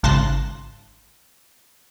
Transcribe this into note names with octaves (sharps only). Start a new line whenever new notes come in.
G#1 C#3 A5 C6 F#6 A#6